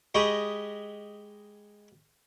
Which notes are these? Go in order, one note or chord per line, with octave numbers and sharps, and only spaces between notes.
G#3 G4 D#5 B5 C#6